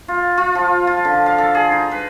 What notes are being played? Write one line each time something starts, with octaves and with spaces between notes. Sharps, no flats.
F4
F4
F3
F4
D3
F5
A4
G#4
D#4
B4